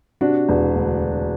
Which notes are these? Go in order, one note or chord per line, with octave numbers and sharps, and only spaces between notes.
C3 D4 F#4
E1
D2